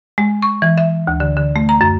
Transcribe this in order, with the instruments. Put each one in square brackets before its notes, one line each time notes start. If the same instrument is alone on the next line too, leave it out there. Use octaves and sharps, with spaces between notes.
[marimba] G#3
C#6
E3
E5
D2
D3
D3
A3
A#5
F#2